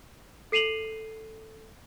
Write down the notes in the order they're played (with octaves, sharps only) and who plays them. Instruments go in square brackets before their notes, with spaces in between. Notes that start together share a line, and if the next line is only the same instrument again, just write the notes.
[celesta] A4 C7 D#7 F7 F#7